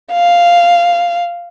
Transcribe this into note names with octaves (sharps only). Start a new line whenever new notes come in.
F5